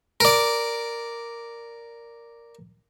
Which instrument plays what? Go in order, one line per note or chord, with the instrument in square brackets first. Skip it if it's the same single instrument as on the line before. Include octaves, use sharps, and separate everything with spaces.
[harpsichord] A#4 D5